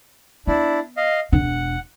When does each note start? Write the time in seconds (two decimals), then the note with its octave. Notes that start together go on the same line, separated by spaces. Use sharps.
0.47 B3 D4 E4
0.97 D#5 F5
1.32 E1 D4 F#5